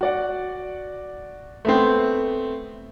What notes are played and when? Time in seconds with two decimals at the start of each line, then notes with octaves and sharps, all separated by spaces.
0.01 F#4 D5 F#5
1.65 A3 B3 C4